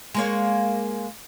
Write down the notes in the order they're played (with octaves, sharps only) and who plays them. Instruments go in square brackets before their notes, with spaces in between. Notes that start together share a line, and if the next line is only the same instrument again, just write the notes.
[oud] G#3 A#3 C#5